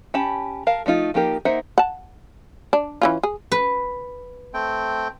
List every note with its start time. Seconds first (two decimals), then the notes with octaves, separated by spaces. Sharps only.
0.14 C#4 G4 A5 B5
0.67 A#4 F5 A5
0.86 F3 A3 D#4 F4
1.14 F3 A#3 D#4 G4 A#4
1.45 A#3 D#4 C5 E5 F#5
1.78 F#5 A5
2.73 D4
3.02 E3 C#4 F4
3.23 G#4
3.52 B4
4.54 A3 C4 G5